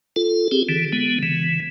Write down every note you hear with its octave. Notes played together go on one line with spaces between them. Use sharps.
F4 A4
C4 G4 G#4
D3 E3
D3 G#3 B3
C#3 E3